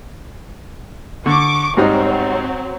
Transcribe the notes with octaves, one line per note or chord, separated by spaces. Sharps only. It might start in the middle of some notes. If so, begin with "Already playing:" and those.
D3 C#6 D6
G#2 F#3 G3 C4 D#4